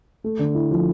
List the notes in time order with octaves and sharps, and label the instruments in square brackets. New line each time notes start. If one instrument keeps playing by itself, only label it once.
[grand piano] A3
D3
E4
F3